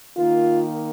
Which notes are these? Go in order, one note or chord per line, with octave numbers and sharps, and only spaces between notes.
D#3 A#3 F4